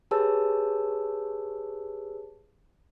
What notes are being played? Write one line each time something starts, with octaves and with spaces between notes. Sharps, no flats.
G4 G#4 B4 C#5 A5 E6